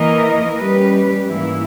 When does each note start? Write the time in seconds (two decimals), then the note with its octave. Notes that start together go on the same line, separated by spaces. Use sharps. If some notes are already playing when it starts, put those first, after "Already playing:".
Already playing: E3 A#3 E4 A#4 D#5
0.57 G3 C#4 G4 B4
1.26 G#2 E3 A#3 E4